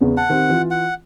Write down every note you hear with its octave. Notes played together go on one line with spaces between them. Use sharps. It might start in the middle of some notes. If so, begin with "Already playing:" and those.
E2 C#3 B3
F#5 A5
D#3 C4 G4
E3 F4
F#5